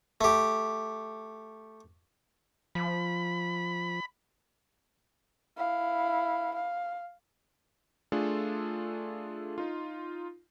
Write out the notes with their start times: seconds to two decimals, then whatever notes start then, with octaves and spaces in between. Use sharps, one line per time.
0.21 A3 G4
2.75 F3 B5
5.57 E4 F5
6.54 F5
8.12 A3 D4 F4 G#4 A4
9.58 D#4 F4